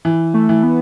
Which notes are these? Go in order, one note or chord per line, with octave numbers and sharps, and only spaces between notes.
E3
A3
E3
B3